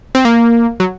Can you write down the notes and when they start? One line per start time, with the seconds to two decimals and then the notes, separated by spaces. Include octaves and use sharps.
0.15 C4
0.25 A#3
0.80 F#3